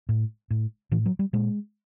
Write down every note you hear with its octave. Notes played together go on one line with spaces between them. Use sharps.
A2
A2
A2 E3
F#3
G3
A#2 G#3